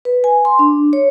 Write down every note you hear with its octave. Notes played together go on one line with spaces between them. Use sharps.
B4
G#5
C6
D4
C#5